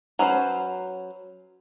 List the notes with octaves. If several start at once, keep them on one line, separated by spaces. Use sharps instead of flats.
F#3 C#4 B4 C5